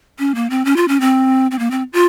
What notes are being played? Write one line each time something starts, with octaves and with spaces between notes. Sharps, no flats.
C#4
A#3
C4
C#4
F4
C#4
C4
C4
A#3
C4
F4